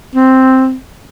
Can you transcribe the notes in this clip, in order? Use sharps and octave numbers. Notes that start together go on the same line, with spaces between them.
C4